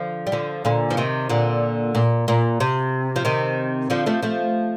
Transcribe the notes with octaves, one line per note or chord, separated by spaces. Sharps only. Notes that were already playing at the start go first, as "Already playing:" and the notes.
Already playing: D3 F3
G3
D3 F3
A#2 D3
F3
C3 D#3
A#2 D3
A#2
A#2
C3
F3
C3 D#3
D3 F3
F3 A3
F3 A3